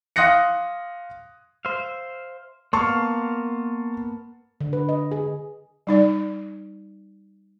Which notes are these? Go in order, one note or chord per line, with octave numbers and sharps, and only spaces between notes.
F5 C6 D#6 F#6 A#6 C#7
C5 E5 F5
A#3 B3 F5 A5 C6 C#6
D3
B4
D#5
G#4
G3 D#4 D5